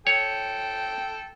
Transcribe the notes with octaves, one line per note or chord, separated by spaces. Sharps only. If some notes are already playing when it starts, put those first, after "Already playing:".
A4 C#5 G5